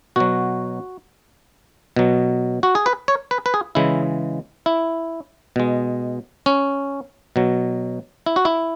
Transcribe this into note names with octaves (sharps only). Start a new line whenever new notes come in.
B2 F#3 F#4
B2 F#3
F#4
G#4
B4
C#5
B4
B4
G#4
C#3 E3 G#3 E4
E4
B2 G#3
C#4
B2 F#3
E4
F#4
E4